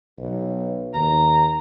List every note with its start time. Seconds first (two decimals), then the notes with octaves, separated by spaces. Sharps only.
0.18 B1
0.94 D#2 A#5